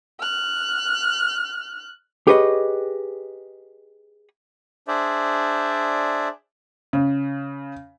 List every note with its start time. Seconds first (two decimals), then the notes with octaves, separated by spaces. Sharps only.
0.20 F6 F#6
2.27 G4 G#4 B4 C#5 D#5
4.88 D4 G#4 C5 D5 E5
6.93 C#3